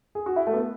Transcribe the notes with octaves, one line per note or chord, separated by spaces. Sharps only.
G#4
F#4
E4
A3
B3